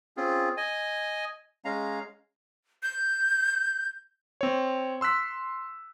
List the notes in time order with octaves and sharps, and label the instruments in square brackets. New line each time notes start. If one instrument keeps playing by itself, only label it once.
[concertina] C4 C#4 F4 G#4
D#5 G#5
G#3 C#4 F5 A#5
[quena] G6
[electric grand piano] C4 C#5
C6 E6 F#6 B6